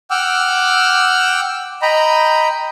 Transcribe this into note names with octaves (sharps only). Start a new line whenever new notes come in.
F#5 G5 D6 E6 F6
D#5 G5 A#5 B5